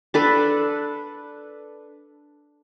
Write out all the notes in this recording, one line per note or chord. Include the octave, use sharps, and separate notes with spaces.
D4 A4 B4